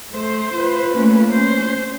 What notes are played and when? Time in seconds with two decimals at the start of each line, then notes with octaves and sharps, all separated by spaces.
0.13 A3 C5
0.54 F4 B4
0.94 A3 A#3 C#4
1.31 C#4 C5